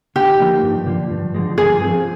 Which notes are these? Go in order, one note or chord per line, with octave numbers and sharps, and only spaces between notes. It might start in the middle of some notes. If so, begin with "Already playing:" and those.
D3 G4
F3 A#3 D#4
G2
D3 F3
G2
D3 F3 G#3
G2 G#4
F3 C4